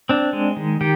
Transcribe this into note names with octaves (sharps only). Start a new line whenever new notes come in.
C4 D4
G#3
D#3
D#3 G4